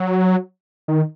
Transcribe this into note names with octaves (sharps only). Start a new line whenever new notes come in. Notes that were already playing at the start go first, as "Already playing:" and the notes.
Already playing: F#3
D#3